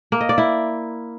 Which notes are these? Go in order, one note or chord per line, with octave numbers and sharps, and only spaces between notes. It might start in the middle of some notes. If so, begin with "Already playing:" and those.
A#3
D#5
D5
E4